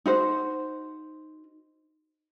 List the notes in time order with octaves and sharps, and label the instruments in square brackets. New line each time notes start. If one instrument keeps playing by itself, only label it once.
[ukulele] D#4 F#4 C5